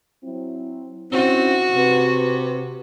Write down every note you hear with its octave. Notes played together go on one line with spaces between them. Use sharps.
F#3 C4 E4
C4 C#4 D#4 E4 F#4
C3 B4